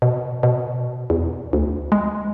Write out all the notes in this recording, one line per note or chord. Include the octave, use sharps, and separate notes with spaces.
B2
B2
E2
D2
G#3